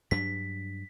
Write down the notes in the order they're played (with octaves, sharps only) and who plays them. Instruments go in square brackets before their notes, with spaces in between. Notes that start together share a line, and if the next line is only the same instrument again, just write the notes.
[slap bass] G2 F#3 D4 [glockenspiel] B6